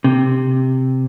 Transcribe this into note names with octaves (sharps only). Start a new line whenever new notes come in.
C3